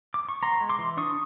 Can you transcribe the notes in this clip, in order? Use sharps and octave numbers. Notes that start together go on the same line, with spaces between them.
D6
C#6
B3 A#5 C6
G#3
C6 D6
E3
D4 C#6 D#6